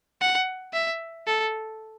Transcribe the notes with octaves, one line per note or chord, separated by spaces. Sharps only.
F#5
E5
A4